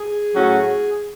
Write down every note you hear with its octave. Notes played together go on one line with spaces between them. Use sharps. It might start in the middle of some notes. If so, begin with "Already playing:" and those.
Already playing: G#4
A2 F#3 C#4 F#4